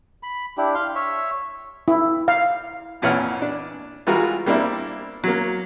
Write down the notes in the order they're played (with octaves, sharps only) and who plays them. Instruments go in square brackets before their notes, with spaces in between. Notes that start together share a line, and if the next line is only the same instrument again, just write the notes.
[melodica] B5
D4 E4 G4
F5 C6
C#5 E5
[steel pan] E4
F5
[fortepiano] F2 A#2 E3 C#5 F#5 F6
D4
E3 G3 G#3 F4 F#4 A#4
G3 A#3 C4 D4 E4
F#3 A#3